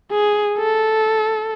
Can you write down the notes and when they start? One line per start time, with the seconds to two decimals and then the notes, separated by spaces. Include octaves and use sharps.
0.11 G#4
0.58 A4